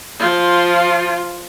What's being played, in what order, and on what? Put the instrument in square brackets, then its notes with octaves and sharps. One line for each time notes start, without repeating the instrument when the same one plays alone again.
[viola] F3 F4